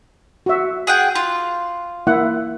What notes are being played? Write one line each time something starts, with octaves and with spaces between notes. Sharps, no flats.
F#4 E5
G#4 F#5 G5
F4
A#3 E4 F#5